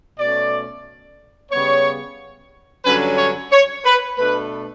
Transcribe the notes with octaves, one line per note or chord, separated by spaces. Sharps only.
B2 A3 C#4 D5
C#3 G3 B3 C#5
G2 D3 F#3 C#4 B4
C#5
C#5
B4
B2 A3 D4 B4